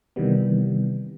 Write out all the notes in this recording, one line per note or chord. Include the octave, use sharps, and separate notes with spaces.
C3 D#3 E3 G3 B3